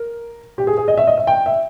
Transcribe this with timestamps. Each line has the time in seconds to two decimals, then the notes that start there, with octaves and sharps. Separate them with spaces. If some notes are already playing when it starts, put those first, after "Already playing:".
Already playing: A#4
0.58 G4
0.67 G#4
0.77 G#4
0.88 D#5
0.98 E5
1.07 D#5
1.18 E5
1.27 G5
1.46 E5